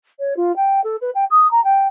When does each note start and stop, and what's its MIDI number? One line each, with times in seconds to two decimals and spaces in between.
0.19 0.34 73
0.36 0.55 65
0.56 0.80 79
0.84 0.96 69
1.01 1.10 71
1.14 1.24 79
1.31 1.49 87
1.51 1.63 82
1.64 1.87 79